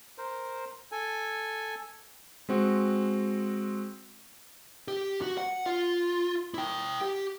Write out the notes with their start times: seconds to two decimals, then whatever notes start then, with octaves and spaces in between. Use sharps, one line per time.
0.18 A#4 C5
0.92 A4 G#5
2.49 G#3 C4 F#4
4.88 G4
5.22 F#4
5.38 F#5
5.66 F4
6.54 E4 G5
7.01 G4